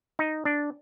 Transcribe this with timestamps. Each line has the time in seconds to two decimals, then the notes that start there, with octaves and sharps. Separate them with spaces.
0.19 D#4
0.45 D4